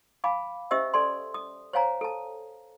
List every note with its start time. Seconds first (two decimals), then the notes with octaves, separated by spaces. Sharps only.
0.24 F5 G#5 B5 D6
0.71 C#4 G4 C5 D#5 E5 E6
0.94 A4 D5 G#5 C6
1.34 D#6
1.73 C5 C#5 F5 G#5 A#5
2.01 A4 A5